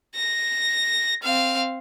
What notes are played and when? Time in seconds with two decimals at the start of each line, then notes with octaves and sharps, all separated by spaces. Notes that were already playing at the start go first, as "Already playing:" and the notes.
0.16 A#6
1.23 C4 F5